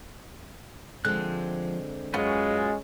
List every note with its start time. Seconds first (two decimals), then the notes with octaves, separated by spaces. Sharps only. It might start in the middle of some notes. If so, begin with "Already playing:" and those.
1.05 D3 F3 G#3 C4 F#6
2.14 F#2 G#3 C#4 F4 F#4 B4